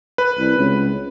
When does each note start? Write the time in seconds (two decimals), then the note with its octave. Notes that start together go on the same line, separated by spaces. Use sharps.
0.18 B4
0.39 C2
0.58 C#2